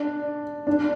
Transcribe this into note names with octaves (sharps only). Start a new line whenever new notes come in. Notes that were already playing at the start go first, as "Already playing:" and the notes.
Already playing: D4
D4